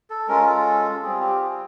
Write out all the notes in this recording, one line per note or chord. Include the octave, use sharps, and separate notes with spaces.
A4
G#3 C#4 F4 A#4
A4
G3 C4 F4 G#4
G4
G#4